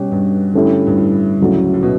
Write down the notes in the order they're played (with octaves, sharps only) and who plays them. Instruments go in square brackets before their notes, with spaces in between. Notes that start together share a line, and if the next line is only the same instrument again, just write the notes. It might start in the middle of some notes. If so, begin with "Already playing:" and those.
Already playing: [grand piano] B2 [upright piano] G3 C#4 G4
[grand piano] G2
[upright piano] D3 A3 C#4 E4 G4
[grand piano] G2
A2
[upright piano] D2 C#3 F#3 A3 E4
[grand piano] A2
B2